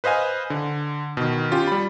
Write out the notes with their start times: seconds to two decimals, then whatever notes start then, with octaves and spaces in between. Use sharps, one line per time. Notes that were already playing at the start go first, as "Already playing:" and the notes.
0.04 B4 C5 D#5 F5 G#5
0.50 D3
1.17 B2 D#3
1.51 C#4 F4 G4
1.67 G3 B5